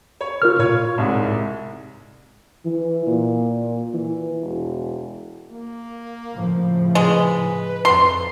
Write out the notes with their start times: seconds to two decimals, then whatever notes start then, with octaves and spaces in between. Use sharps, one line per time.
0.21 C#5
0.42 F4 A#4 F6
0.59 A2 F4 C#5 G#6
0.98 C2 G#2
2.65 E3
3.07 A#2
3.93 E3
4.42 E1
5.51 A#3
6.34 A2 C#3 F3
6.95 G#3 B4
7.85 F2 C6